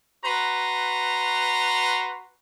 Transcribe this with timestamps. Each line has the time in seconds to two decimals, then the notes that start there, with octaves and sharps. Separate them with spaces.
0.24 F#4 B4 A#5 C6